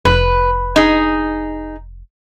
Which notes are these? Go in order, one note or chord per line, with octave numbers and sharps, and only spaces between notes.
F1 B4
D#4 G#4